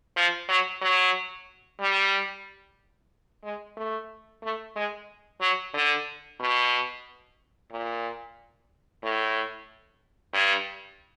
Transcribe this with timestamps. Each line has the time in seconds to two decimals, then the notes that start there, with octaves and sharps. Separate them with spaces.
0.17 F3
0.48 F#3
0.81 F#3
1.80 G3
3.44 G#3
3.77 A3
4.43 A3
4.76 G#3
5.41 F#3
5.74 D3
6.40 B2
7.71 A#2
9.03 A2
10.34 G2